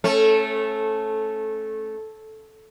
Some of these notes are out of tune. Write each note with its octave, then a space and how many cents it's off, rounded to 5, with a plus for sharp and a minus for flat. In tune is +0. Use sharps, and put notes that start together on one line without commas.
A3 -10 C#4 -30